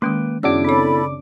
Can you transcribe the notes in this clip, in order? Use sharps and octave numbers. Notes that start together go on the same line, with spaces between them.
D#3 G#3 A#3 C#4 B4 G5
F#2 C#3 B3 D4 E4 F#4 D6 E6
C4 A4 C#5 B5